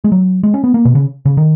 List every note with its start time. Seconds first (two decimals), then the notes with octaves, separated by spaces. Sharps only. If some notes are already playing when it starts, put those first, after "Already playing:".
0.04 G#3
0.12 F#3
0.43 G#3
0.54 C#4
0.64 B3
0.74 A#3
0.85 B2
0.95 C#3
1.25 C#3
1.37 D#3